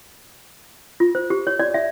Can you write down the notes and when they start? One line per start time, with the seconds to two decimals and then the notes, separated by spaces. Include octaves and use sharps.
1.00 F4
1.15 C5
1.30 G4
1.47 C#5
1.59 D5
1.74 E5